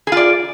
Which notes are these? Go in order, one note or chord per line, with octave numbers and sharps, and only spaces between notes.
F4 G#4 D5